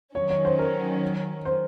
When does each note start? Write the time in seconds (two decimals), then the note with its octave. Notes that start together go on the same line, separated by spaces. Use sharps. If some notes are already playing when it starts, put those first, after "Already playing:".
0.15 D#3 F#3 C#4 C#5
0.30 C#5
0.45 C5
0.59 A#4
1.45 C5